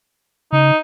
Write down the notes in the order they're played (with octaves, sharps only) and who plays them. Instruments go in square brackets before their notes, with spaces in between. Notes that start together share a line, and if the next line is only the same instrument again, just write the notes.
[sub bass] C#3 [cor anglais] D#4